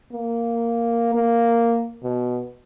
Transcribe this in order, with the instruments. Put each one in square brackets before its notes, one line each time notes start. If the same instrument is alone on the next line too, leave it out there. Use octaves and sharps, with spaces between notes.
[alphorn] A#3
A#3
B2